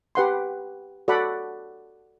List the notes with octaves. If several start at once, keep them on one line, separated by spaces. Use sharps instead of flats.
G4 B4 F#5 C6
F#4 A4 D5 F#5 B5